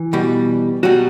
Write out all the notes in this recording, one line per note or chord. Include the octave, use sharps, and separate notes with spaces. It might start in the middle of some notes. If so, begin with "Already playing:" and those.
Already playing: E3
B2 G3
B2 F#3 G3 F#4